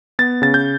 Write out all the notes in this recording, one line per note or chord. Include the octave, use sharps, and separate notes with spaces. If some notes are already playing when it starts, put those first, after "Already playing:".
B3 A6
C#3 A6
G6